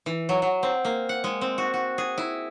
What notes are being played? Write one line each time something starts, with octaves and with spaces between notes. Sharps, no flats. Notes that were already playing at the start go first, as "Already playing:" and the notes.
E3
F#3
F#3
C4
A#3
F#5
G#3
C4
F#4
F#4
G#4
E4